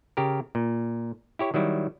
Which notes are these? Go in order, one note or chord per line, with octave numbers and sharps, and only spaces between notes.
C#3 G4 A#4
A#2
E4 G4 C#5
D#3 F#3 G3 E4